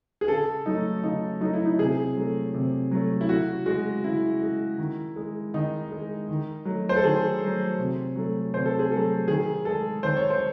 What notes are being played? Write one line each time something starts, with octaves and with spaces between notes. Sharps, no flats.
G#4
C#3 A4
F#3 A3 D#4
C#3 D#4
F#3 A3 D#4
E4
D#4
C3 G#4
F#3 A3
C3
F#3 A3
E4
C#3 F#4
G#3 F#4
C#3 E4
G#3
D#3
G#3
D#3 D#4
G#3
D#3
F#3 A3
C5
A4
D#3 G#4
F#3 A3
C3
F#3 A3
C3 C5
A4
G#4
F#3 A3 A4
D#3 G#4
G#3 A4
D#3 C5
C#5
C5